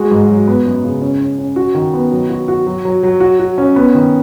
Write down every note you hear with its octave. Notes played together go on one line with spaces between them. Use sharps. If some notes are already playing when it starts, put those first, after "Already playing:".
Already playing: G#3 F#4
G#2
F#3
B3
F#2
C#3
C#4
C#4
C#4
F#4
D#3
B3
F#3
F#4
F#4
F#3
F#3
F#3
F#4
F#4
C#4
B3
D#3